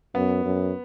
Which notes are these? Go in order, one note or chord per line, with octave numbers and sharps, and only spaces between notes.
F#2 B3
F#2